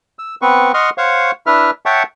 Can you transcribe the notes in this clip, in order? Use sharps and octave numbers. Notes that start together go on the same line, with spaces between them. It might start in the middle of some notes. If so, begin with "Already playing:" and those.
E6
B3 C4 B4 C#6
D#5 F#5 C6 C#6 D#6 F6
C5 C#5 F5 F#5 C#6
D4 E4 B4 E5 F6
C#5 E5 F#5 G5 A5 C#6